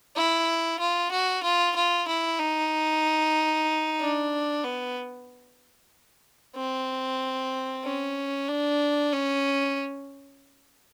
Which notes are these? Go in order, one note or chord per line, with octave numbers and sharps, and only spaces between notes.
E4
F4
F#4
F4
F4
E4
D#4
D4
B3
C4
C#4
D4
C#4